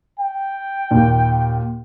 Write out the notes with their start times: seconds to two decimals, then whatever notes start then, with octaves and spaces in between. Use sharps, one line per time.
0.20 G5
0.91 D#2 A#2